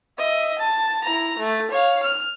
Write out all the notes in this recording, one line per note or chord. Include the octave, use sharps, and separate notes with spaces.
D#5 E5
A5
E4 A#5
A3
C#5 F5
F6